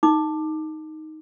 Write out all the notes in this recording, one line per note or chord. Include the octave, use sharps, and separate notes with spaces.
D#4 D6